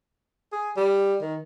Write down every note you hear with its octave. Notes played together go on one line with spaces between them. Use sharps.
G#4
G3
D#3